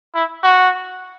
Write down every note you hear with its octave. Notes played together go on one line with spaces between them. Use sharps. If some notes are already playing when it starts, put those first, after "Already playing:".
E4
F#4